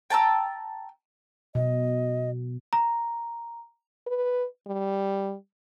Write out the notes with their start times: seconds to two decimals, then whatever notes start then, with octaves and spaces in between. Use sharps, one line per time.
0.10 G5 A5 A#5 E6
1.55 B2 D#5
2.73 A#5
4.07 B4
4.67 G3